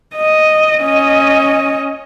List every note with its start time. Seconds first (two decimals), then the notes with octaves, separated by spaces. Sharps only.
0.16 D#5
0.81 C#4 D#5